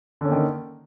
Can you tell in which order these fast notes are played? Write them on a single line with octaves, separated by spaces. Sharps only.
D3 C#4 A#3 D#3